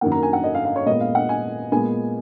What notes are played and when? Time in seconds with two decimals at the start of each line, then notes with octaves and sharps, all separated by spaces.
0.01 F#2 D#3 A#3 F#5
0.12 A#5
0.23 G#5
0.33 F#5
0.44 D#5
0.54 F5
0.65 F5
0.76 C#5
0.86 A#2 G#3 B3 D#5
1.01 F5
1.15 F#5
1.29 G#5
1.72 A#2 G#3 B3 G#5